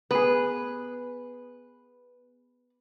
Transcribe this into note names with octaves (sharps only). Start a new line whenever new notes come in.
B3 G#4 B4